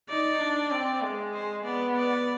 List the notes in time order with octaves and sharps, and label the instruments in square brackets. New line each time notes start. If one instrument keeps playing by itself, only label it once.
[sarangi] D#4 [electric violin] D5
[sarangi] D4
C4
G#3
[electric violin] C5
[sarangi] B3 [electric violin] D5
[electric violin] D5